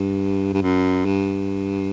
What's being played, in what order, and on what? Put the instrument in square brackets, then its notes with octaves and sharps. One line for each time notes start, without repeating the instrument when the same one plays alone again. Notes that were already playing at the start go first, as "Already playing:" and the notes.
Already playing: [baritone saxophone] G2
G2
F#2
G2